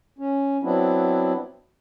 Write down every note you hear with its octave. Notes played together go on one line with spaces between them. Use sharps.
C#4
F#3 B3 C4 D4 E4